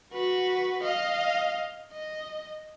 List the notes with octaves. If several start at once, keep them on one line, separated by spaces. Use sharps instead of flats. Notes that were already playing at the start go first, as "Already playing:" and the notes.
F#4 B4
D#5 F5
D#5